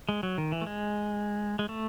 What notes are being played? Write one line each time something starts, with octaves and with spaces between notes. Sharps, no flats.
G#3
F#3
D#3
E3
A3
G#3
G#3
A3